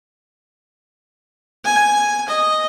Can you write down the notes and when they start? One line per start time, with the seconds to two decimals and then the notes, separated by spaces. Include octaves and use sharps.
1.65 G#5
2.28 D#5